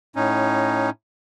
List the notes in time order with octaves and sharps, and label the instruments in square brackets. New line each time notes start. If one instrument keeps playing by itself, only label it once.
[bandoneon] A2 C#4 D#4